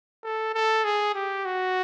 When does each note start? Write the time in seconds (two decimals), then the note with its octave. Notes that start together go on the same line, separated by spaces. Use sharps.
0.24 A4
0.54 A4
0.84 G#4
1.15 G4
1.45 F#4